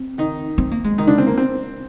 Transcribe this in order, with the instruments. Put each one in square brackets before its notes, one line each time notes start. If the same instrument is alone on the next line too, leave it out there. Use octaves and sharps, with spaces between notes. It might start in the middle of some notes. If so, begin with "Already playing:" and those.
Already playing: [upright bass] C4
[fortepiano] D#3 D#4
[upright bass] C4
A#3
G#3
[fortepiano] D#3 D#4
D3 D4
C4
A#3
C4